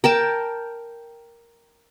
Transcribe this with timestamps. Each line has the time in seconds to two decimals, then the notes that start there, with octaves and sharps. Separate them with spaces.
0.04 A#4 G5 A5